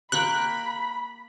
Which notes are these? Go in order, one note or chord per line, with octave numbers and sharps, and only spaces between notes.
A#3 G5 B5 C#6 F#6